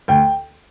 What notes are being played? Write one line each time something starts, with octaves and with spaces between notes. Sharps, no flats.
D2 G5